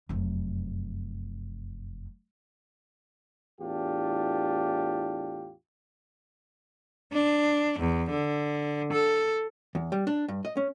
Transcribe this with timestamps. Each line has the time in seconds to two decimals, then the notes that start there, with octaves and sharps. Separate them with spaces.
0.09 F1 F#2
3.61 E2 A2 D4 F4 G4
7.13 D4
7.79 E2
8.10 D3
8.93 A4
9.75 E2
9.92 G3
10.07 D4
10.28 G2
10.45 D#5
10.57 C#4